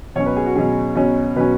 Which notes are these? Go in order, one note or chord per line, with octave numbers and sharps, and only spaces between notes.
B2 F#3 C#4 C#5
B4
G#4
F#4
B2 F#3 C#4 G#4
B2 F#3 C#4
B2 F#3 C#4 B4